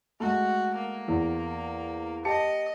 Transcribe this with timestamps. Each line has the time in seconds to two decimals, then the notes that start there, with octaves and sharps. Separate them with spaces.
0.20 G#3 A3 F#4
0.75 A#3
1.08 E2
2.25 G4 D#5 A5 C#7